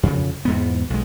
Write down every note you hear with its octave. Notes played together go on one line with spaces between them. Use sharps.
F2 C#3
E2 G#2 B3
B1 G#3